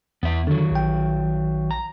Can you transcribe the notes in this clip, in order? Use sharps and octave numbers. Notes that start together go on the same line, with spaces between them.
E2 B3 E5
D3 D#3 F#3
A#1 G5
A#5